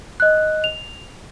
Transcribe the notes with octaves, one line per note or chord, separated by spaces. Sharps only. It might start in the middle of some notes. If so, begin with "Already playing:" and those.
D#5 F#6
F7